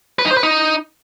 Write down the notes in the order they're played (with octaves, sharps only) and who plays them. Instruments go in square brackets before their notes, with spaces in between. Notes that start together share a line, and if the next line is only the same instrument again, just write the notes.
[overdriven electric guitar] B4
D#4
C5
B4
D#4